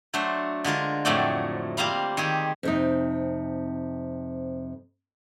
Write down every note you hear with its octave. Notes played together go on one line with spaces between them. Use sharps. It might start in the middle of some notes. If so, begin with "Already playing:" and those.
F#3 A3 D4 C5
D3 G#3 F4 A#4
F2 A2 F#3 A3 D5 G5
G3 A#3 C4 F5 A#5 B5
D#3 C4 G4 G#4
F2 C3 D#4